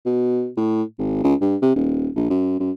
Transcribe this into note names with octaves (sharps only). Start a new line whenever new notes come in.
B2
A2
G#1
C#2
G2
C3
D#1
A#1
F#2
F#2